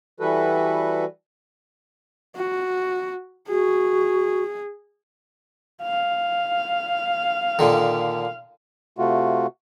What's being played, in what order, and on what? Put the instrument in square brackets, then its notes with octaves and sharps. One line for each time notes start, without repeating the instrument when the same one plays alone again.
[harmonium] E3 G3 F#4 A4 B4
[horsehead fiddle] F#4
[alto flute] F#4 [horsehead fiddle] G#4
[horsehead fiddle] F5
[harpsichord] A#2 D3 D#3
[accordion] C3 A3 F4 F#4